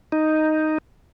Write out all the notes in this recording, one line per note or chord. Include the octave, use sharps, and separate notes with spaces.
D#4